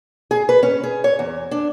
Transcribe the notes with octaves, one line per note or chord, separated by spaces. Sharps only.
G#4
B4
C#4
G#4
C#5
E2
D4